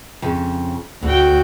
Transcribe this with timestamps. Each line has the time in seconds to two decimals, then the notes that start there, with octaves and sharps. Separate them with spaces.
0.22 F2 C#3
1.03 D2 D3 F#4 G5